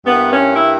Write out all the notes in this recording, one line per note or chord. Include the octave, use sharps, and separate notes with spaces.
G2 E3 A#3 B3
C#4
E4